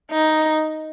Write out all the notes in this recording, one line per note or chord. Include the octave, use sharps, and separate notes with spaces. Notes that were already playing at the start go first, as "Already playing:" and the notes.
D#4